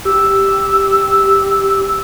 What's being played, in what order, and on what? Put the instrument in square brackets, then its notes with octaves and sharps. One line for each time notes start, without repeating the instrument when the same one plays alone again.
[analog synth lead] G4 [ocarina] E6